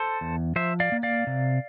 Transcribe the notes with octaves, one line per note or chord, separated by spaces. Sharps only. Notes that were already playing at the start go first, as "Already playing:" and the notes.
Already playing: A4 C5
E2
F3 C5 E5
D5 F5
A#3
D5 F5
C3